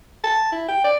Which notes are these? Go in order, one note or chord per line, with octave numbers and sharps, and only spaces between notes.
A5
E4
G5
D5